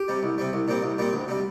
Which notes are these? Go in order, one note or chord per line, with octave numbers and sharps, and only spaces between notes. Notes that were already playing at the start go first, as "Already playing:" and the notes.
Already playing: G4
C3 G3
C2
C3 G3
C2
A#2 G3 C4
C2
A#2 G3 C4
D2
C3 G3